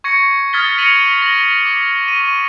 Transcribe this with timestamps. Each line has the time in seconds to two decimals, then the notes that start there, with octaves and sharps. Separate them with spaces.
0.04 C#6 G#6 A#6 C#7
0.53 D#6 F6 G#6 A6 B6 G7
0.78 A#6 B6 C#7 D#7 F7 F#7
1.22 A#6 F#7
1.65 D6
2.08 C#6 D#7